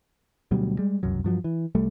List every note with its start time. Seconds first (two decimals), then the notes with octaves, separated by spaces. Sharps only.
0.51 D2 B2 F#3 G3
0.79 G3 G#3
1.03 E1 C2 F#2 F#3
1.24 G2 F3 F#3
1.44 E3
1.75 C2 G3 A3